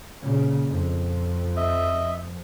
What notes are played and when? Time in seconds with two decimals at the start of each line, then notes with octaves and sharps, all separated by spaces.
0.20 A#2 C#3
0.68 F2
1.56 D#5 E5